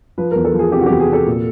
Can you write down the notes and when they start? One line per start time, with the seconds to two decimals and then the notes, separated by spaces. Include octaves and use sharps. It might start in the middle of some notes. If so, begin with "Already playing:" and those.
0.18 F3 B4
0.31 E2 A#4
0.45 A4
0.54 F3
0.59 G#4
0.72 C3 G4
0.81 F#4
0.86 E2 G4
1.00 G#4
1.08 C3 A4
1.26 A#2